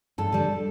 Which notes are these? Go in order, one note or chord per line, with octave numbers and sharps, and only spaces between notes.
G2 A4
D3 G3